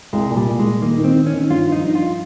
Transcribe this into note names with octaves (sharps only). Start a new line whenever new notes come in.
C2 G#3
A#2
G3
A#2
G#3
A#2
D#3 A#3
D#3
C4
D#3
C#4
D#3
G2 F4
F3 D#4
G2
F4